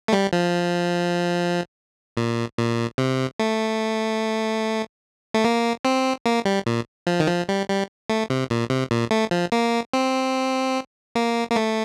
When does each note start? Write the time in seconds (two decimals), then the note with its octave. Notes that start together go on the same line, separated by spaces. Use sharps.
0.08 A3
0.13 G3
0.33 F3
2.17 A#2
2.58 A#2
2.98 C3
3.39 A3
5.34 A3
5.44 A#3
5.85 C4
6.26 A#3
6.45 G3
6.66 A#2
7.07 F3
7.20 D#3
7.28 F3
7.49 G3
7.69 G3
8.10 A3
8.30 C3
8.50 A#2
8.70 C3
8.91 A#2
9.11 A3
9.31 F3
9.52 A#3
9.94 C4
11.15 A#3
11.52 A#3
11.56 A3